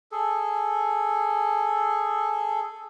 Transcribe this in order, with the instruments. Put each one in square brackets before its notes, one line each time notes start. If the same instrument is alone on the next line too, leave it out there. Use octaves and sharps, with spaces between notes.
[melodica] G#4 A4